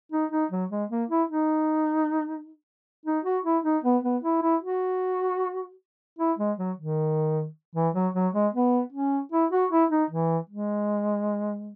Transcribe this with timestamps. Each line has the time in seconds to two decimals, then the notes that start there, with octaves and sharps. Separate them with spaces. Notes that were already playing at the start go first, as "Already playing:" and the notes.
0.12 D#4
0.32 D#4
0.51 F#3
0.71 G#3
0.90 A#3
1.09 E4
1.30 D#4
3.06 D#4
3.25 F#4
3.44 E4
3.65 D#4
3.84 B3
4.04 B3
4.24 E4
4.42 E4
4.63 F#4
6.19 E4
6.39 G#3
6.58 F#3
6.77 D#3
7.76 E3
7.94 F#3
8.14 F#3
8.34 G#3
8.53 B3
8.93 C#4
9.32 E4
9.51 F#4
9.71 E4
9.91 D#4
10.10 E3
10.50 G#3